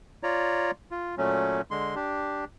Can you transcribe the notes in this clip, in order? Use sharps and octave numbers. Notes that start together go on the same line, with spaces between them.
F4 C#5 D5 A#5
F4
A#2 F#3 A3 C#4
D3 G#3 C6
D4 G4